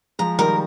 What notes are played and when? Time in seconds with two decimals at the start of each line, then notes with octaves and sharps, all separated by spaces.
0.19 F3 G#3 A#5
0.39 D#3 G3 A#4